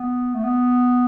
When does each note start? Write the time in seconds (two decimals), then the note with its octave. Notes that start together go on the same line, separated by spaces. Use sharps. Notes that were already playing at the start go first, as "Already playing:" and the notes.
Already playing: B3
0.34 A3
0.44 B3